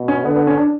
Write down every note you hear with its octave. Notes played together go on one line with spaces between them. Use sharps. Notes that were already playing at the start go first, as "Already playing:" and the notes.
Already playing: B2
C#4
D3 B3
B3
C#4
D4